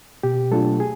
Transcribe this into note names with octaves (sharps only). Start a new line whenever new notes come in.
B2 G4
F#3 A3 D4 F4 A4
G#4